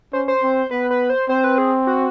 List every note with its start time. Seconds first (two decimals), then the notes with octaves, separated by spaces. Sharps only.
0.13 C#4 C5
0.28 C5
0.43 C4
0.71 B3 B4
0.91 B4
1.10 C5
1.29 C4 C5
1.44 B4
1.58 G#4
1.87 F#4